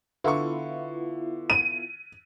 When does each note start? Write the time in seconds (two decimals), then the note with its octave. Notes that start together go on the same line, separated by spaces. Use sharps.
0.24 D3 B3 E4 F4 C#6
1.50 D#7